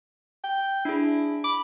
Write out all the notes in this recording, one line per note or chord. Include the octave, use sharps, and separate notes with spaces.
G5
D4 E4 G#4
B5 D6